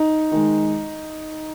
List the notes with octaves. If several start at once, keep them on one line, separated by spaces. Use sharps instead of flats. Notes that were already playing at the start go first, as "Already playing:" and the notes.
Already playing: D#4
D#3 G#3